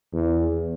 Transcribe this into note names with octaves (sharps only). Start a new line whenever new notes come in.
E2